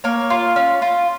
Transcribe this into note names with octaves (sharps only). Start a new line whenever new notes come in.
A#3 C#5
F4
C#4
F4